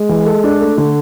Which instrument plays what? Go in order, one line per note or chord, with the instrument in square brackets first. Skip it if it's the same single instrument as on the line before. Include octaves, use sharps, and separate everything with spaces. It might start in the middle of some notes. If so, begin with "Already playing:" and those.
Already playing: [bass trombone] G#3
[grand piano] E3
A4
D4
A3
D3